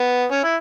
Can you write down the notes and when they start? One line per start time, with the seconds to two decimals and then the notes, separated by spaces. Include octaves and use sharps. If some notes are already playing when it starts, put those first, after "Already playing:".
Already playing: B3
0.31 C#4
0.43 E4